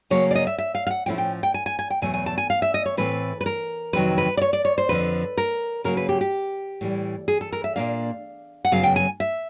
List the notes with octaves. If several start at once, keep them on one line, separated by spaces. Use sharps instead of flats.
C#3 F#3 A#3 C#5
D5
D#5
E5
E5
F5
F5
F#5
A2 F3 A3 C#4 E4 G5
G5
G5
G#5
G#5
G#5
G5
E2 B2 F#3 A3 G#5
G#5
A5
G#5
F5
E5
D#5
C#5
A2 E3 A3 C4 B4
B4
A#4
F2 C3 D#3 F#3 B4
B4
D5
C#5
D5
C#5
C5
F2 D3 F3 B4
A#4
C#3 F#3 A#3 A#4
B4
G4
G4
A2 E3 G3
G#4
A4
A#4
E5
A#2 F#3 A#3 D4 F5
F#5
F#2 C#3 F#3 B3 F5
G5
G#5
E5